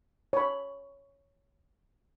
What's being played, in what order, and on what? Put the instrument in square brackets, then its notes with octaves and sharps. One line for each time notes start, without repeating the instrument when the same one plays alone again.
[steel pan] C#5 B5